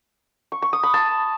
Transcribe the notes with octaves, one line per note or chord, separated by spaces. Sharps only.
C#6
C#6
D#6
B5
A5